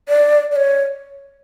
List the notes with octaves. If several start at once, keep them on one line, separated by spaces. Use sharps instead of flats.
D5
D5
C#5